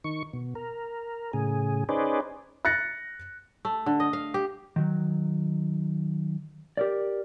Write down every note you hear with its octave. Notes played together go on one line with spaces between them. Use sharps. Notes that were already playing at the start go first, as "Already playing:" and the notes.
D#3 C#6
B2
A#4
A2 C#3 G#4
C#4 D#4 G#4 B4 C5 D5
F#6 A6 A#6 C#7
A3
D3
D#5
F5
G4
D#3 F#3
G4 A#4 D5